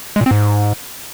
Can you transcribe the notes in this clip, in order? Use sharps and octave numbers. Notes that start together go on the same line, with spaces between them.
G#3
A#2
C4
G#2